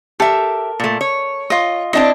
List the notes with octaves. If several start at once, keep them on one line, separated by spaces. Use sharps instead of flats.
G4 A4 A#4 E5
A#2 A3
C#5
F4 D#5
C4 D4 E4 D#5 A5